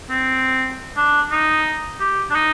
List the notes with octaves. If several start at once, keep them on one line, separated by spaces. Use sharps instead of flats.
C4
D4
D#4
G4
D4
D#4